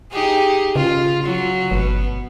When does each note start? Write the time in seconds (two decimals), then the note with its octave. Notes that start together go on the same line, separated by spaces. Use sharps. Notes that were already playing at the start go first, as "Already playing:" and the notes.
0.12 D#4 G4 G#4
0.76 C#3 F4
1.24 F#3
1.71 G1 B2 B3